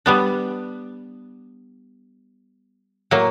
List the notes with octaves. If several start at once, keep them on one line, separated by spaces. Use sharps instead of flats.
G3 B3 D4
A2 F#3 A#3